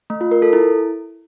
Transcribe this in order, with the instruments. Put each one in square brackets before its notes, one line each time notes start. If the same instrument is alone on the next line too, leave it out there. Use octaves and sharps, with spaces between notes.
[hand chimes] A3
F4
A#4
A4
E4